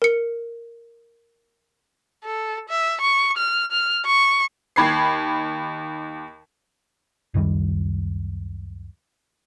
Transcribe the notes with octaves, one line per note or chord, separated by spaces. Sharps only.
A#4 C#7
A4
E5
C#6
F6
F6
C#6
D#2 B5 G#6 C7
C#2 F#2 D#3 G3